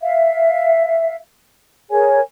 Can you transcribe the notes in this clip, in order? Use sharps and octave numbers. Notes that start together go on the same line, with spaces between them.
E5 F5
G#4 A#4 C#5 G#5